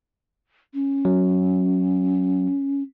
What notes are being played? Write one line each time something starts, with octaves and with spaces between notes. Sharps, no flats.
C#4
F#3